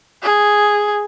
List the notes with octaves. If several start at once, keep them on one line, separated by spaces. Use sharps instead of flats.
G#4